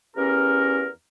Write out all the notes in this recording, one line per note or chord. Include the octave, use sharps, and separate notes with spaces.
E2 C#4 G4 A#4